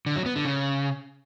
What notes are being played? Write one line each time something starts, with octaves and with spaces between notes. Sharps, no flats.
D3
F#3
B3
D3
C#3